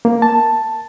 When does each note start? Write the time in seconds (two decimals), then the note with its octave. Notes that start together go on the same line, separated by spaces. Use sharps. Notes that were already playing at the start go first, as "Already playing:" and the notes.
0.05 A#3
0.22 A5